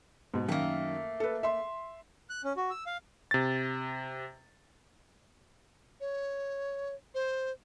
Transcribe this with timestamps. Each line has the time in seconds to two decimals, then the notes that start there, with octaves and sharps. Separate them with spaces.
0.34 G#2 B2
0.49 F#2 D#3 A3 A#3
1.20 A4 B4
1.43 E5 C6
2.30 F#6
2.44 C#4
2.57 F#4
2.70 E6
2.87 F5
3.31 C3 A6
6.00 C#5
7.14 C5